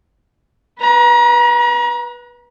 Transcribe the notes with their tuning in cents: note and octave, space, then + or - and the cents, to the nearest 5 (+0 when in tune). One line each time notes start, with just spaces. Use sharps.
B4 -15 A#5 +35